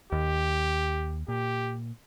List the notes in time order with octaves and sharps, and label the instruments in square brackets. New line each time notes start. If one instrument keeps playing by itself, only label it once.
[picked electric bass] D#2 [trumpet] G4
[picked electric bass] A#2 [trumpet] G4